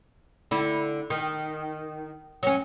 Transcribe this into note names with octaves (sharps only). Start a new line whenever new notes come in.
D3 E4
D#3
F#3 C#4